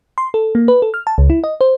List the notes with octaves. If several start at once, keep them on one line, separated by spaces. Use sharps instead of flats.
C6
A4
A#3
B4
A4
F6
A5
C#2
E4
D#5
C5